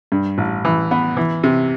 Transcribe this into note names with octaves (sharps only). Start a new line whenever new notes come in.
G2
A1
E3
B3
E3
C3